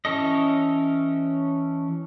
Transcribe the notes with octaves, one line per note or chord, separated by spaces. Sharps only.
E3 C#4 A4 D#5